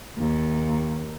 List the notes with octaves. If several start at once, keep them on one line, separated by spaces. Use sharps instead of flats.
D#2